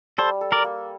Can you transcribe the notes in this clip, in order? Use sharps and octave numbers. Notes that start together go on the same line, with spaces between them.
G3 A4 C5
A4
A#4 D5
A#3